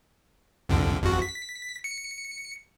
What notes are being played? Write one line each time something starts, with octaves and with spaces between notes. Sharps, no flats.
C2 F2 D3
G#1 F2 F#4
B6
C#7